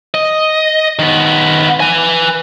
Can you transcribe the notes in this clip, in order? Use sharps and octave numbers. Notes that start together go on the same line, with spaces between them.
D#5
D#3 B3
B4 G#5